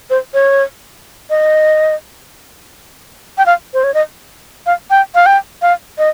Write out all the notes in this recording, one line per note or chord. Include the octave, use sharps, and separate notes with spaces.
C5
C#5
D#5
G5
F5
C5
C#5
D#5
F5
G5
F5
G5
F5
D#5